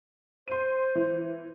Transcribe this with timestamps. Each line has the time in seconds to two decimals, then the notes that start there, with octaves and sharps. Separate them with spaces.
0.48 C5 C6 D#7
0.95 E3